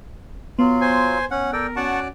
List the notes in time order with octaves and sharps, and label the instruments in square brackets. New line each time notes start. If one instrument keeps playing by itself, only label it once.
[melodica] F#3 F4 C6 [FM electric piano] B3
[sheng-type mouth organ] C5 G#5
[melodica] C#4 F#5
[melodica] A4 D5 G5 [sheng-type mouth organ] A#4
[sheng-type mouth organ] C#4 F#4 D5 [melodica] F#5 A5 C#6